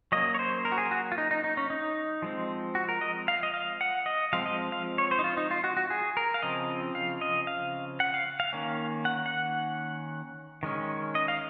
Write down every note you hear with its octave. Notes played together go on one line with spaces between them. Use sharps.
F#3 A#3 C#4 D#5
C#5
C5
A#4
F#4
G#4
F#4
F4
D#4
D#4
D#4
C#4
D#4
F3 G#3 C4
F#4
A#4
D#5
F5
D#5
F5
F#5
D#5
F3 G#3 C4 F5
D#5
F5
C#5
C5
D#4
F4
D#4
F4
F#4
F#4
G#4
A#4
F5
C#3 F3 C4 D#5
F5
D#5
F5
F#5
F5
F5
D#3 A#3 C#4
F#5
F#5
D#3 G#3 C#4
D#5
F5